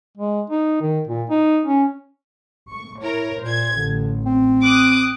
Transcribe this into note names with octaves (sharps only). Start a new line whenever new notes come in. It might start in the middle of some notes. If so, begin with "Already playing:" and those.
G#3
D#4
D#3
A#2
D#4
C#4
C#6
E4 A#4 C#5
A#2 C5 G#6
A1 D3
C4
D6 D#6 F#6